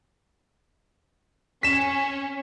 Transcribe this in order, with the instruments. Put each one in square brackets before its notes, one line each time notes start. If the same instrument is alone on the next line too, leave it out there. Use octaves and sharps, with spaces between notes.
[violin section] C#4 [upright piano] B6 E7